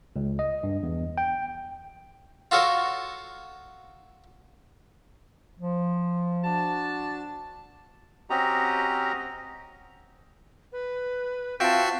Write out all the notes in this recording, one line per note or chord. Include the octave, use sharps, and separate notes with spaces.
C#2
D#5
G2
E2
G5
F4 F#4 A4 A#4 C#5
F3
D4 F#4 A5
C4 C#4 F#4 G4 D#5 A#5
B4
C4 F4 F#4 E5 G5 A5 C7